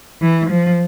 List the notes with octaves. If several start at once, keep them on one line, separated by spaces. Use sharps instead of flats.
E3
F3